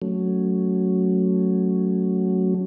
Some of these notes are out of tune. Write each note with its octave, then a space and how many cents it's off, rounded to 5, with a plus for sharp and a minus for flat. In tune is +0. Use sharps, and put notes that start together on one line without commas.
F#3 +0 A3 +0 C#4 +0